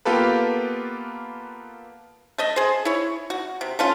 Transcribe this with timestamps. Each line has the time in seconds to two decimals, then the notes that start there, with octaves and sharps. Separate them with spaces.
0.05 A#3 B3 F4 G4 A4 B4
2.38 A3 D#5 E5
2.56 G#4 C5
2.85 E4 C#5
3.30 F#4
3.61 C3
3.79 A3 C#4 F4